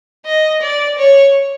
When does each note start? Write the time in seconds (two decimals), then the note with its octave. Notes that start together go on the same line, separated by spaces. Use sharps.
0.26 D#5
0.62 D5
0.98 C#5